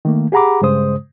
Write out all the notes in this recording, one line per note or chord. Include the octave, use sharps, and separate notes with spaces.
D#3 A3 A#3
G4 G#4 F#5 A#5 B5 D6
G2 C#3 G#3 C5 D#6